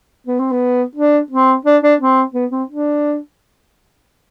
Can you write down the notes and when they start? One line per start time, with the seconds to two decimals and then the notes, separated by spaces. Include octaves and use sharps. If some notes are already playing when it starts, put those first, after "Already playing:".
0.27 B3
0.40 C4
0.52 B3
0.96 D4
1.31 C4
1.65 D4
1.83 D4
2.00 C4
2.34 B3
2.52 C4
2.69 D4